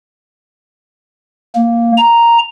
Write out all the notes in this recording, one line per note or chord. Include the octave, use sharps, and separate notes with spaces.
A#3
A#5